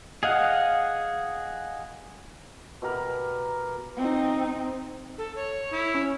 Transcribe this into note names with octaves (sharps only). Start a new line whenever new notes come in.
G#4 D#5 F5 F#5
B2 G4 A#4 B5
C4 D#4
A4
C#5
E4
C#4